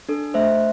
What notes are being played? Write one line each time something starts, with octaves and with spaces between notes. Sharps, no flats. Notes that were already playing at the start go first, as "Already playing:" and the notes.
D4 A4
A3 C5 E5